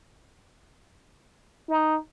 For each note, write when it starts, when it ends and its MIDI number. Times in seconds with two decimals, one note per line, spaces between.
1.69 1.96 63